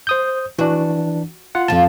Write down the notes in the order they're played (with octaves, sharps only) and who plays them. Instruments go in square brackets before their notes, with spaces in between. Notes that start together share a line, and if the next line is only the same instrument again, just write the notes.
[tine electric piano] C5 D#6 G6
[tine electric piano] E3 D4 [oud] F#4
[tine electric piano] F4 F#5
[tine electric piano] F2 A5 [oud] F3 F4